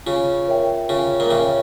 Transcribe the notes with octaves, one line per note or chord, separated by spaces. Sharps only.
C#3 F4
A#4 C#5 E5 G5
C#3 F4
A#2
C#3 A#4 C#5 E5 G5